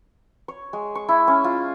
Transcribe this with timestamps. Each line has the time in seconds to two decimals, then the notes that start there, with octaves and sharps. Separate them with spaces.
0.48 C#5
0.73 G#3
0.95 C#6
1.08 E4
1.28 C#4
1.44 F4